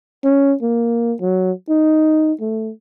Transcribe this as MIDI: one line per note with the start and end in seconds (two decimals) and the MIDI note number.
0.24 0.54 61
0.62 1.14 58
1.21 1.51 54
1.69 2.33 63
2.40 2.71 57